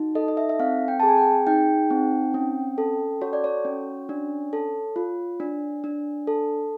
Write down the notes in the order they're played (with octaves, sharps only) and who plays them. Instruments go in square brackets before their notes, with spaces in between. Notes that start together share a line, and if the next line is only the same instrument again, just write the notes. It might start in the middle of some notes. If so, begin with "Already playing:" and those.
Already playing: [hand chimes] D#4 F#4
A4 D#5
D#5
E5
E5
C4 F5
G5
G#4 A5
G#5
G5
D#4 G5
C4
C#4
A4
F#4 C#5
D5
C#5
C#4
D4
A4
F4
D4
D4
A4